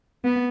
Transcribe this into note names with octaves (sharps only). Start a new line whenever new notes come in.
B3